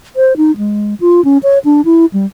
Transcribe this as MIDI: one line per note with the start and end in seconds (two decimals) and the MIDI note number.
0.16 0.36 72
0.37 0.56 63
0.57 0.94 56
1.00 1.23 65
1.24 1.38 61
1.43 1.59 73
1.65 1.81 62
1.85 2.06 64
2.13 2.26 55